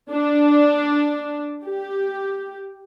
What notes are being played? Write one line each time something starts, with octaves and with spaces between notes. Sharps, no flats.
D4
G4